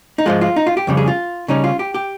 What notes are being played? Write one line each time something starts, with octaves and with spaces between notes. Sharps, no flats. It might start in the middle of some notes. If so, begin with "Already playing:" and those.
D#4
G#2 F3 G#3 F4
F4
D#4
F4
G4
F2 C#3 G3
G#4
F4
C#3 G3 C#4 D#4
F4
G4
G4